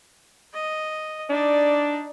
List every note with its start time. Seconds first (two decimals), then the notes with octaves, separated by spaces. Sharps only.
0.53 D#5
1.30 D4 D#4 D5